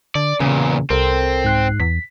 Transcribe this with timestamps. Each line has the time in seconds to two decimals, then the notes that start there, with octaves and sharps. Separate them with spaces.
0.15 D3 D5
0.40 E2 A#2 C#3
0.90 C2 C4 A4 A#4
1.44 G#2 F#6 C7
1.80 E2 B6